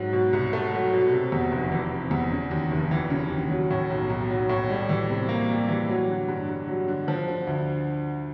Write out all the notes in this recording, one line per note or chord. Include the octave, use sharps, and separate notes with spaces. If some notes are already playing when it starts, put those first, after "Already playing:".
Already playing: G#2 F#3
B2
C2
A3
F#3
B2
C3
E2
F1
E3
C3
E2
C#3
D#2
F1
E3
C#3
D#2
F#3
A2
B1
B1
F#3
A2
G3
E3
C3
A#3
G3
E3
F#3
D3
G2
G2
F#3
D3
F3
D3
D2